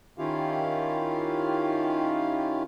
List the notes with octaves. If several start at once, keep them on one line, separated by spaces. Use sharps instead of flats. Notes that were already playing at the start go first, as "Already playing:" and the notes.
D#3 C#4 E4 F4 G4 F5